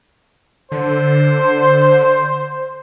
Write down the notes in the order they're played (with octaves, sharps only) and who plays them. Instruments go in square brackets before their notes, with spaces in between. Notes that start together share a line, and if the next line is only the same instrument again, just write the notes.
[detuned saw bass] D3 [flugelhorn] C5